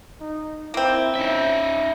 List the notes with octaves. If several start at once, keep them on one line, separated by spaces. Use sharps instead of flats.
D#4
A#3 C4 E4
C#4 D#4 E5